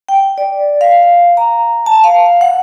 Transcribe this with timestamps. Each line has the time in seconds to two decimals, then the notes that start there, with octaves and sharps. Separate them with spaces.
0.09 G5
0.38 D5
0.81 F5
1.37 A#5
1.86 A5
2.04 F5
2.41 F#5